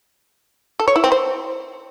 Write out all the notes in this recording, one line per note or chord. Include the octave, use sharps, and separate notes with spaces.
A4
C#5
E4
C4
C5